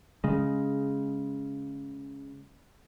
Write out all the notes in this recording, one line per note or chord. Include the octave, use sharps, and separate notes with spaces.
C#3 G#3